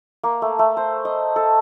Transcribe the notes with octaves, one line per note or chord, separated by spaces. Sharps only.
A#3
A3
A3
C5
D#5
A4